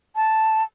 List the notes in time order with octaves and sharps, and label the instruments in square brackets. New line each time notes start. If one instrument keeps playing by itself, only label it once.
[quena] A5